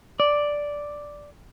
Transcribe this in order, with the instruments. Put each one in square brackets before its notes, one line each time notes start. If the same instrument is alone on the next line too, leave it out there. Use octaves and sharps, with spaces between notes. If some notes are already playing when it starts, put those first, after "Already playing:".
[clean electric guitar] D5